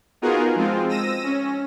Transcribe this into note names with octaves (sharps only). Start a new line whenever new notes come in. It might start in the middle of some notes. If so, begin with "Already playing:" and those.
B3 D#4 F4 F#4 G#4 A#4
F3 G#3 C4 F4
E6 A#6 D#7
C#4